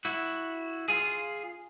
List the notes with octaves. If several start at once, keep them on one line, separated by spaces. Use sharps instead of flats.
E4 F#4
F4 G#4